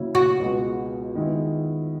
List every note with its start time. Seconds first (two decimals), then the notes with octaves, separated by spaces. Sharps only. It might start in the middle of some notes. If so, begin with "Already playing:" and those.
Already playing: C#3 F#3 A#3 C#4 E4
0.15 F#4
0.40 C#2 B2 G#3 B3
1.15 D#3 G#3 B3 E4